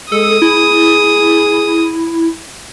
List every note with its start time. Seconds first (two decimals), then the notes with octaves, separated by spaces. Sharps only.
0.12 G#3 A4 D#6
0.42 E4 G#4